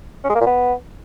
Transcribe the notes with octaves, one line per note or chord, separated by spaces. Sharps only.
C#4
G#3
A#3
A#2
B3